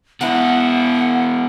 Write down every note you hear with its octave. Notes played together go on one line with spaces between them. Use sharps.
B2 E4 F#5